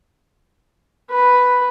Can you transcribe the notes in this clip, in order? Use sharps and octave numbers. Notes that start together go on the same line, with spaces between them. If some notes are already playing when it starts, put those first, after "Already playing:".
B4